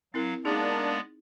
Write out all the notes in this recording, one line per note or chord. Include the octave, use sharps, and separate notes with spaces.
F#3 C4 E4 A#4 F5
G#3 A#3 B3 D4 D#4 G#4 D5